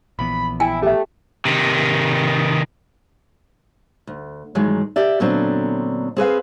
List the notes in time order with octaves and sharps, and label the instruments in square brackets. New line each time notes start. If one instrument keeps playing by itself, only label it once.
[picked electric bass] A#1 E3 B3 [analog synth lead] B5
[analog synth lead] E4 [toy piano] G5 G#5
[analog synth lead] A3 [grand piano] G4 E5
[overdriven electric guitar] C3 D#3
[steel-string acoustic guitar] D2
G2 D#3 E3 F#3 G#3
G4 D5 E5
A#2 D3 F#3 B3 C4 D4
C4 G#4 B4 F5